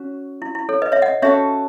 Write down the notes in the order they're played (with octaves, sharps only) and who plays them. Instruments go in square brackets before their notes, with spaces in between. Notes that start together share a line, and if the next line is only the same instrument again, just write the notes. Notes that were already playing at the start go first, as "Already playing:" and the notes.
Already playing: [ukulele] C#4 F#4
[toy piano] E4
E4
A4 C#5
B4 D#5
C#5 E5
D#5 F#5
[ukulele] C#4 F#4 A4 [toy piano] C#5 E5